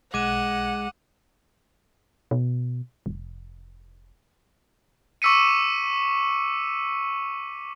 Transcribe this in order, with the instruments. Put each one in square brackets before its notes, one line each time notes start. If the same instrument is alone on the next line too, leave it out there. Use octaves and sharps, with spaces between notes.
[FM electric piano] B1 [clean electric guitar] G#3 [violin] F#5 [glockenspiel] D6 D#7 E7
[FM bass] B2
F1
[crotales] C#6 D6 E6 B6 C#7 D#7